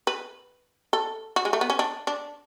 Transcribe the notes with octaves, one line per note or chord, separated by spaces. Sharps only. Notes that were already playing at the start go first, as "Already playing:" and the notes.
B4
A4
F#4
G#3
A3
B3
C#4
D4
D4